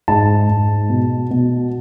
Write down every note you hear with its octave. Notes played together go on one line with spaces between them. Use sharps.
G#2 A5
G#2
B2
B2